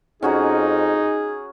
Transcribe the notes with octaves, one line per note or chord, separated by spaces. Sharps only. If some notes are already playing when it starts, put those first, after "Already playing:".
F2 C#4 D#4 F#4 G#4 A#5